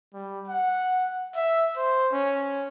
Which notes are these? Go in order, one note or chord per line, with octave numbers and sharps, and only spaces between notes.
G3
F#5
E5
C5
C#4